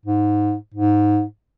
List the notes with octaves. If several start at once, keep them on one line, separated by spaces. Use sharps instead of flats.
G#2
G#2